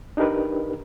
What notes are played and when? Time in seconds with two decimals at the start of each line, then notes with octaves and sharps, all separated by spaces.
0.17 D4 D#4 G4 A#4 B4